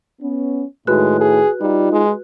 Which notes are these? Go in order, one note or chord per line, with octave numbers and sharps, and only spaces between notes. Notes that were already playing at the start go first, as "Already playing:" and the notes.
B3 C#4
A2 D#3 G#3 F#4 B4 F#6
G#4
G3 D#4 F4
G#3